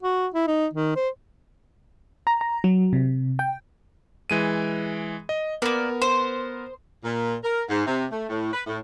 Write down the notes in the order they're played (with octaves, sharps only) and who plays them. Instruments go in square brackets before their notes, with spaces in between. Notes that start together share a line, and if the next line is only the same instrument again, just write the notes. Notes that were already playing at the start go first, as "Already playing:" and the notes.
[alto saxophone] F#4
E4
D#4
D#3
C5
[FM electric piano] A#5
A#5
F#3
C3
G5
[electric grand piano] E3 G#3 D#7
D#5
[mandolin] A#3 D5 [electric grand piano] B3 A#4
[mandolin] C5
[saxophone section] A#2
A#4
G#2
C3
A3
A2
B4
A2